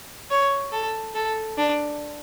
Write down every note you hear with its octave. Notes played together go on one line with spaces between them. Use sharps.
C#5
A4
A4
D4